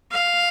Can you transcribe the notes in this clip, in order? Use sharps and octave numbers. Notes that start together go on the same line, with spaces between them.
F5